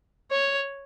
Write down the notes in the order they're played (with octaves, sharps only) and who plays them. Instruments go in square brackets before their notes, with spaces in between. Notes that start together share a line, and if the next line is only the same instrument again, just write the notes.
[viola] C#5